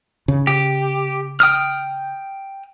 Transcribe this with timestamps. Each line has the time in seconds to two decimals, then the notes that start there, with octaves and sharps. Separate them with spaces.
0.28 C#3
0.47 G4
1.40 G5 D#6 F6